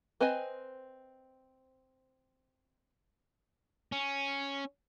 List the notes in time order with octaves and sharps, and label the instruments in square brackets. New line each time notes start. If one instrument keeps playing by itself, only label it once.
[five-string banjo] C4 B4 C5 D#5 G#5
[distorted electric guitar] C#4